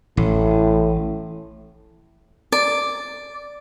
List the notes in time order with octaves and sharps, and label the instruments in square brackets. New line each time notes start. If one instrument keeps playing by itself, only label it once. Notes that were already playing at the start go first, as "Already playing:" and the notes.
[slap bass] A1 [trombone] A2
[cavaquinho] D5